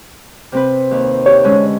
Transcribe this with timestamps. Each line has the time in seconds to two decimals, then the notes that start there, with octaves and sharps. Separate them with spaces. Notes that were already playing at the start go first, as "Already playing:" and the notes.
0.52 C3 C4 B4
0.91 D#2
1.26 G4 C#5
1.44 D3 G#3 C#4